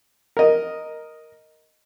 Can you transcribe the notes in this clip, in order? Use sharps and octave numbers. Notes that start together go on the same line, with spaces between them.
A#4 D#5